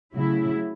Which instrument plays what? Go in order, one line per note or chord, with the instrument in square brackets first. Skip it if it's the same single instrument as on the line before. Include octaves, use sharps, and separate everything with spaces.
[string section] C#3 F#3 A3 E4